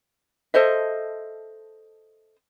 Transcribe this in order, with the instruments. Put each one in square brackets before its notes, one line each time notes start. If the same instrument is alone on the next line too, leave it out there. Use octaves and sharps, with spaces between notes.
[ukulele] A4 C5 D#5 E5